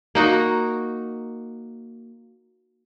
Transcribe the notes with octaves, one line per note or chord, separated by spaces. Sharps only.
A#3 D#4 F#4